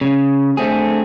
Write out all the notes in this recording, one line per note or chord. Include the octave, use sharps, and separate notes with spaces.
C#3
D3 A3 C4 G#4